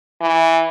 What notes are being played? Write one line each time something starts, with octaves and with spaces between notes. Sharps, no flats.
E3